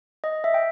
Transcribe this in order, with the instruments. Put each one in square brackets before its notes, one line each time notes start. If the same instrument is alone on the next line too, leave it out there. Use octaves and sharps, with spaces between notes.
[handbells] D#5
E5
G5